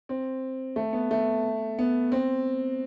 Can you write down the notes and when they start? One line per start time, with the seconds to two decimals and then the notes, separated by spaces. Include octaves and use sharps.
0.09 C4
0.76 A3
0.93 B3
1.11 A3
1.78 B3
2.12 C4